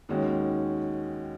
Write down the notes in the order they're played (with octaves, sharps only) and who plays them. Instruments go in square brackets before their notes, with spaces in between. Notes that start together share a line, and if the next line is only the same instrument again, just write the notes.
[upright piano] D#2 D#3 G#3 C#4 F#4